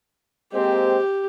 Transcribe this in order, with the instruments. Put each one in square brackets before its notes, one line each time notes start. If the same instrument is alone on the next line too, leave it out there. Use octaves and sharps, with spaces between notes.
[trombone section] G#3 A#3 C4 [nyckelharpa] G4